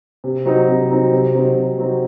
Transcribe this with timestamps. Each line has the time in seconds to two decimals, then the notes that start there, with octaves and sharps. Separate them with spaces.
0.24 C3
0.46 F#3 C4 D#4
0.68 C3
0.91 F#3 C4 D#4
1.13 C3
1.34 F#3 C4 D#4
1.56 C3
1.78 F#3 C4 D#4